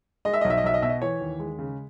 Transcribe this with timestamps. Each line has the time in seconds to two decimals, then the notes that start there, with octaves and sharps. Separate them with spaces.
0.25 G#3 D#5
0.33 E5
0.41 D#5
0.44 B1
0.50 E5
0.58 D#5
0.64 B1 E5
0.74 D#5
0.82 B2 E5
0.89 D#5
1.02 E3 C#5
1.21 D#2
1.40 G#3
1.59 C#3